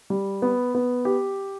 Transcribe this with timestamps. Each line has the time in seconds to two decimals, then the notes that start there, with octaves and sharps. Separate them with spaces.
0.10 G3
0.42 B3
0.75 B3
1.05 G4